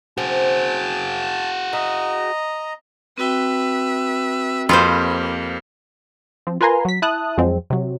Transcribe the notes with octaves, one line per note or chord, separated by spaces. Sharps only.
C4 F#4 G#4 A5
D#5 E5 A#5
C4 F#4 B4 E5 G5
F2 A#3 F4 G4 B4 C5
F3 C4
F4 A#4 B4 G#5 A#5 C6
F#3 B6
E4 A5 D#6 F#6
F2 F3 F#3 G#3 C4
C3 F#3